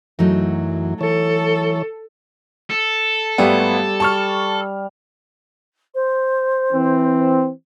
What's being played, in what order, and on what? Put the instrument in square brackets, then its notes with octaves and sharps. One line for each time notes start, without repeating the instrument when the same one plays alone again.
[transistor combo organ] F#2 E3 [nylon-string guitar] F#3 A3 D#4
[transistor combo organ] E3 C#5 [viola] A4
[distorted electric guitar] A4
[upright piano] G#1 A3 B3 [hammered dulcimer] G3
[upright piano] A5 C#6 F6
[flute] C5
[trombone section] E3 C4